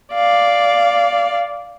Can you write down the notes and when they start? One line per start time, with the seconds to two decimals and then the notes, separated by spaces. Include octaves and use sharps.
0.14 D5 F5